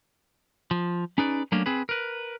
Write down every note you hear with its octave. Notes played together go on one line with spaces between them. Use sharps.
F3
C#4 D#4 G#4 B4 D5
F#3 A3 A#3 C#4 D4
C4 G#4 B4
A#4 B4